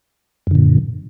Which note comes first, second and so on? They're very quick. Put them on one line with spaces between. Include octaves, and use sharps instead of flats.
F#2 D3 A#2